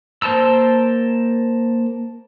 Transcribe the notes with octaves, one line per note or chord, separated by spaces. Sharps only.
A#3 C5 A5 A#5 E6